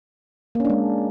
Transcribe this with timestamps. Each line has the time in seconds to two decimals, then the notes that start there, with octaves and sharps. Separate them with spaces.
0.55 A#3
0.60 C#4
0.65 D4
0.70 G#3